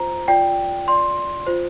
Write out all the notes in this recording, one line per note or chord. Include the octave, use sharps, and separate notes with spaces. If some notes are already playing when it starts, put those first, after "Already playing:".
Already playing: F4 C5 A#5
F4 D5 G5
F4 D5 C6
F4 C5